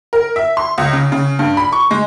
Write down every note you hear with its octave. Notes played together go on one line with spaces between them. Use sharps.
A#4
E5
C6
C#2
C#3
C#3
G2
B5
C#6
G#3